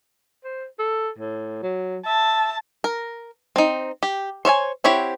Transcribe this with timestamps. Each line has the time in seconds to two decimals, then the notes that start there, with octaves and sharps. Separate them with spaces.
0.44 C5
0.79 A4
1.18 A2
1.63 F#3
2.06 E5 A5
2.84 A#4
3.56 C4 D#4
4.03 G4
4.45 C5 C#5 E5 G#5
4.84 C4 E4 G4 C#5 F#5